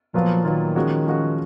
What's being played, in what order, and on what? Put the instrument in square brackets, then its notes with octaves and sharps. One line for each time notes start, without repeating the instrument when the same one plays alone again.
[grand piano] A#2 F#3 B3 F4 [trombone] F3
[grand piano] A#2 F#3 B3 F4 [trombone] D#3
[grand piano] F3 G#3 C#4 F#4
F3 G#3 C#4 F#4